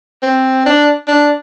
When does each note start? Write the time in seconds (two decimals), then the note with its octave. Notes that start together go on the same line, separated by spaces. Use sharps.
0.23 C4
0.66 D4
1.08 D4